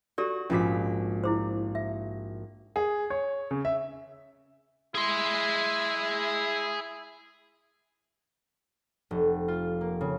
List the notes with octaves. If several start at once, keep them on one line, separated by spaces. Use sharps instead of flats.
F#4 G4 A4 D5
A#1 G#2 C#4 F4 G#4 B6
E4 G#4 C5
E5
G#4
C#5
C#3
E5
E4 G#4 C6
F1
F4
A#3
C#3